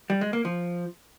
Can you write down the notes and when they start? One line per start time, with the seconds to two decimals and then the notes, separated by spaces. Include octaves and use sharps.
0.10 G3
0.21 G#3
0.33 A#3
0.45 F3